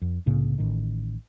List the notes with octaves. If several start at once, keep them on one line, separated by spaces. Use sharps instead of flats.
F2
C2 A2 C#3 A#3
A1 A2 D#3